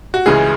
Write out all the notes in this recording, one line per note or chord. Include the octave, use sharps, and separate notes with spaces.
F#4
C#2 C#3 E3 G#3 G#4